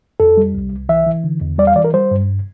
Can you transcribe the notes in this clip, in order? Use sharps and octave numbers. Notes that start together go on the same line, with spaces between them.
F2 A4
G3
C2
C2
E3 E5
E3
D3
E2
G3 D5
F5
E3 D5
A#4
G3 C5
G2